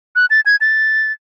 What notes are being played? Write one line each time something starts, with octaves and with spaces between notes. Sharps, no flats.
F#6
A6
G#6
A6